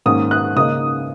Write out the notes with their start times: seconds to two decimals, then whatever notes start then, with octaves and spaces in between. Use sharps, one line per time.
0.06 G#2 D#3 A#3 C#4 D#6
0.31 F#6
0.56 C#3 A#3 D#4 D#6